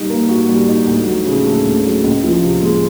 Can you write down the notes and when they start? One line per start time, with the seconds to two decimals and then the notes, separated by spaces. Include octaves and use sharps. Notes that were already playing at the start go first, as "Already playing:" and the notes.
Already playing: G3 D#4
0.10 A#3
0.29 F#4
0.48 G3
0.68 D#4
0.87 D2
1.06 F#3
1.26 C#3
1.46 A3
1.65 D2
1.84 F#3
2.03 C#2
2.23 F3
2.42 C3
2.62 G#3